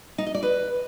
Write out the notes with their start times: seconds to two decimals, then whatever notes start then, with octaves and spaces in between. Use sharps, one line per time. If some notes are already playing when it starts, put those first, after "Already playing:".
0.18 D#4
0.26 D#5
0.34 D5
0.43 B4